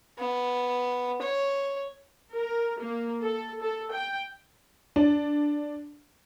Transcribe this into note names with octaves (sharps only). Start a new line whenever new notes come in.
B3
C#5
A#4
A#3
A4
A4
G5
D4